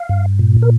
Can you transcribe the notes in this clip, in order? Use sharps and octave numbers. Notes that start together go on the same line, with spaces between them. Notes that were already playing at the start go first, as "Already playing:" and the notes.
Already playing: F5
G2
A#2
A#4